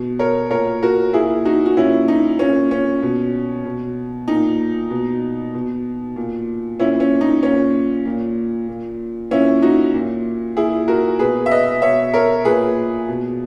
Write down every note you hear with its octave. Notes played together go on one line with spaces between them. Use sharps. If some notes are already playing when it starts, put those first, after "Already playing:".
Already playing: B2
A#4 C#5
A#2 A#4 C#5
F#4 A#4
A#2 E4 G#4
D#4 F#4
F#4
A#2 C#4 E4
D#4
A#2 C#4
C#4
B2
B2
A#2 D#4
B2
B2
A#2
A#2 C#4 E4
C#4
D#4
A#2 C#4
A#2
A#2
A#2 C#4 E4
D#4 F#4
A#2
A#2 E4 G#4
F#4 A#4
B2 G#4 B4
E5
B4 D#5
B2 C#5 E5
A#4 C#5
A#2 G#4 B4
B2